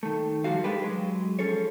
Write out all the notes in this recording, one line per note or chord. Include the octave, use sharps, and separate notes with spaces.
D#3 A3
G#2 F3 G3 F#4 F5
G#3 D4 G4 B4
F#3 G#3
F3 C#4 G#4 A4 C#5